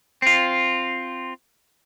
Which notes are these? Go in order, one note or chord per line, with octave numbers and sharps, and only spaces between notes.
C4 F4